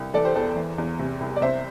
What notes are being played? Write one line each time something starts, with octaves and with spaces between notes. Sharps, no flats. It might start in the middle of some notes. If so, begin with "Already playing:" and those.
Already playing: C2
E3 A4 D5
G4 C5
E2 A4
E3
E2
C3
C2
D5
C3 C5 E5